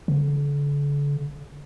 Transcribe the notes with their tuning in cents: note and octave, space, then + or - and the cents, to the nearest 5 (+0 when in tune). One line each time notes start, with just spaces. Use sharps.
D3 -40